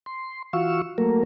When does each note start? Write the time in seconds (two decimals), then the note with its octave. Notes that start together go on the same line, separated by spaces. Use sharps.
0.06 C6
0.53 E3 F4 F#4 F5 C#6 E6
0.98 F#3 A3 A#3 A#4